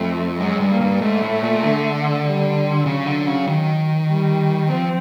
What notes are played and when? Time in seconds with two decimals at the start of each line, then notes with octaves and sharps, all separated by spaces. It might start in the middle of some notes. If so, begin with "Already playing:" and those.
Already playing: F2 A3
0.40 F#2 G#3
0.60 G2
0.71 A#3
0.81 G2
1.01 G#2 A3
1.22 A2
1.42 A#2
1.62 D3
2.24 G3
2.85 C#3 F#3
3.06 D3
3.27 C#3
3.47 D#3
4.09 G3
4.70 F3 C4